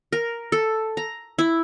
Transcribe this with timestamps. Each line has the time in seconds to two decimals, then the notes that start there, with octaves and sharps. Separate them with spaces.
0.12 A#4
0.52 A4
0.97 A#5
1.38 E4